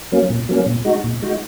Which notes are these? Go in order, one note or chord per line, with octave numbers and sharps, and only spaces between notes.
F#3 A#3 C#4
A#2
F#3 A#3 C#4
A#2
G#3 D#4 F#4
A#2
G#3 D#4 F#4